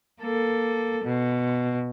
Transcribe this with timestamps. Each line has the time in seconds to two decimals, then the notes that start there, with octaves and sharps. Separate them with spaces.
0.22 A#3 A4
1.04 B2